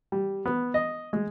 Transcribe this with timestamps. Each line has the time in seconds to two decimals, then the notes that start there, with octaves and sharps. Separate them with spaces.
0.12 G3
0.45 B3
0.74 D#5
1.13 G#3